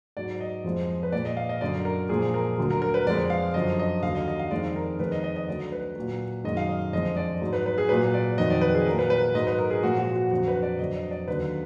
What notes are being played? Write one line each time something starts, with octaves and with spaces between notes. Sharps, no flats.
G#2 F#3 D5
D#5
F2 F3 G#3
B4
A#2 G#3 D5
D#5
F5
D#5
F#2 D3 F#3 D5
A#4
A#2 F3 G#3 G#4
A#4
D2 D3 F#3
A#4
A#4
B4
F2 F3 G#3 D5
F5
F#2 D3 F3 D#5
D#5
D#2 D3 F#3 F5
D#5
D#5
F5
F2 D#3 G#3 D5
A#4
F2 D#3 G#3 B4
D#5
D#5
D#5
D2 D3 F#3 D5
B4
A#2 F#3
F#2 D#3 G#3 D#5
F5
D#5
F2 D3 F3 G#3 D#5
D5
G#2 F#3
B4
B4
G#4
A#2 F#3 B4
D5
F2 D#3 F#3 D#5
D5
B4
G#4
A#2 F#3 A#4
B4
B4
G#2 F#3 D#5
B4
A#4
G#4
A#2 F3 G#3 F#4
F#4
F#4
F2 D3 F#3 F#4
B4
D5
F2 D3 F#3 D#5
D#5
D5
D#2 D3 F#3 B4